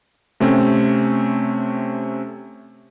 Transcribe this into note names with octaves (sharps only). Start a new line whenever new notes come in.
C3 A3 C4 C#4